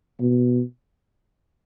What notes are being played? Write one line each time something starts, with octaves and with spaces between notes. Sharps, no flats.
B2